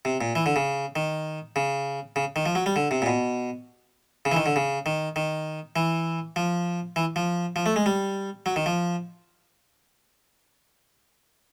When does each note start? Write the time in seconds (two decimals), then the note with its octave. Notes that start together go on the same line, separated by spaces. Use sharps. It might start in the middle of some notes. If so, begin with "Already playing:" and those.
0.05 C3
0.21 A#2
0.35 E3
0.46 D3
0.56 C#3
0.96 D#3
1.56 C#3
2.16 C#3
2.36 D#3
2.46 F3
2.55 F#3
2.66 G3
2.76 D3
2.91 C3
3.02 A#2
3.06 B2
4.25 C#3
4.32 E3
4.36 D#3
4.46 D3
4.56 C#3
4.86 D#3
5.16 D#3
5.76 E3
6.36 F3
6.96 E3
7.16 F3
7.56 F3
7.66 A3
7.76 G#3
7.86 G3
8.46 F#3
8.56 D#3
8.66 F3